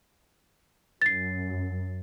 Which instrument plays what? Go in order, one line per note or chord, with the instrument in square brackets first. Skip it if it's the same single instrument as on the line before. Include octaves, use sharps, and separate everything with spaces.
[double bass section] F#2 [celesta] A6 C7